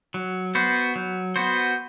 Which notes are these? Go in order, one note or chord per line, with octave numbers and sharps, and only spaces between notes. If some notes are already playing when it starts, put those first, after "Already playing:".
F#3
B3 F#4 C5
F#3
B3 F#4 C5